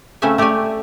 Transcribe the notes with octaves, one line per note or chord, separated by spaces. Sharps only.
C#3 A3 C4 C#4 E5 G#5
A3 G4 C#5 D5 G#5